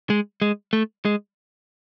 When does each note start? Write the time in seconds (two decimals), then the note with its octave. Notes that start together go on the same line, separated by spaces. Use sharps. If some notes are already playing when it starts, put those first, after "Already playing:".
0.10 G#3
0.42 G#3
0.73 A3
1.05 G#3